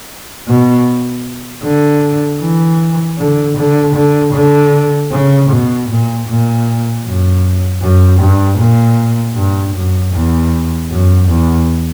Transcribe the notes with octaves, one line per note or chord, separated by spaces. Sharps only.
B2
D3
E3
D3
D3
D3
D3
C#3
B2
A#2
A#2
F#2
F#2
G2
A#2
G2
F#2
E2
F#2
E2